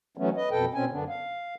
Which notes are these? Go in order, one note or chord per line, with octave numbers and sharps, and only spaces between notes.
E3 F#3 A3 B3 C#4
B4 D#5
F2 B2 A4 B4 G5
B2 C4 C#4 G#5
F#2 D3 B3 D4
F5